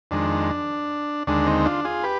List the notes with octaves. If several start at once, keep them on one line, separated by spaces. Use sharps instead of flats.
F2 D#3 G#3 D4
D#2 D3 G#3 D4
C4 D#4
D4 F4
F4 G#4
G4 B4